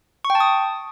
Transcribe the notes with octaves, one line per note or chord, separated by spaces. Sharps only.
C#6
G5
A5
D#6